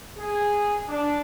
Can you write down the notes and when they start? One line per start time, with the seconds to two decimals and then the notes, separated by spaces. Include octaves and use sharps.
0.17 G#4
0.88 D4